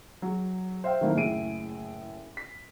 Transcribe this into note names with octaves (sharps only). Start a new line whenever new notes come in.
F#3 G#4
C5 E5 F5 G5
D#3 F#3 A3 A#3 C4 E4
F#1 A2 G#4 E5 D7 D#7
B6